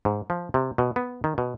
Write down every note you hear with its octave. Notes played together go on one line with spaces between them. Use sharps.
G#2
F3
C3
B2
B3
D#3
B2